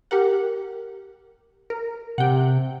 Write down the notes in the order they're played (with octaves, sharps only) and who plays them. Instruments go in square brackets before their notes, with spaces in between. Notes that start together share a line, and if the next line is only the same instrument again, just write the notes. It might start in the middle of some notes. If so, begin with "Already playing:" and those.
[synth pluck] G4 A#4 F#5
A#4
[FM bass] C3 [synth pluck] F#5 G5